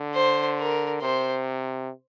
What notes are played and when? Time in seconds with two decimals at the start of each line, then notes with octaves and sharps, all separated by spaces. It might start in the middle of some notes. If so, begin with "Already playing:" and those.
Already playing: D3
0.15 C5
0.58 A#4
1.01 C3 C5